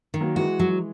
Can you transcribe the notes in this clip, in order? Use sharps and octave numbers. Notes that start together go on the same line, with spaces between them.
D#3
F#3 A#3
E3 G#3 F#4
F#3